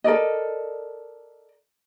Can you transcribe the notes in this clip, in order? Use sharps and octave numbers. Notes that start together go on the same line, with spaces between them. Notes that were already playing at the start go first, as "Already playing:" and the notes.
A4 A#4 D5 D#5